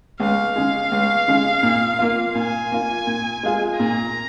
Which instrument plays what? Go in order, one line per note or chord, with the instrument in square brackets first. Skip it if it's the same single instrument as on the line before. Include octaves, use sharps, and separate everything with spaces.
[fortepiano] C#2 [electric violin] F5
[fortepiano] C#3 G#3
C#2
C#3 G#3
A#2
A#3 F4
[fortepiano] A#2 [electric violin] G#5
[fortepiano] A#3 F4
A#2
G#3 F4 G#4
[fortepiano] A#2 [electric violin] A#5